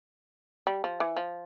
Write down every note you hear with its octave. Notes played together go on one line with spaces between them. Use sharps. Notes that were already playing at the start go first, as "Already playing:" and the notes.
G3
F3
E3
F3